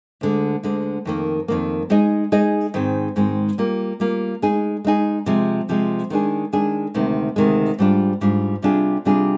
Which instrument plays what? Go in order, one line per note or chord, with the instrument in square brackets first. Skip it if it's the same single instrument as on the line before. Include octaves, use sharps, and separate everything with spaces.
[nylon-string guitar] D2 D3 G#3
D2 D3 G#3
F2 D#3 A#3
F2 D#3 A#3
G#3 D#4 G#4 D#5
G#3 D#4 G#4 D#5
G#2 D#3 G#3 C4
G#2 D#3 G#3 C4
G3 A#3 F4
G3 A#3 F4
G#3 D#4 G#4
G#3 D#4 G#4
C3 F3 G#3
C3 F3 G#3
D#3 G#3 D4 G#4
D#3 G#3 D4 G#4
D2 C3 D#3 G#3
D2 C3 D#3 G#3
G#2 G3 D4 F4
G#2 G3 D4 F4
C3 G3 D4 F4 G#4
C3 G3 D4 F4 G#4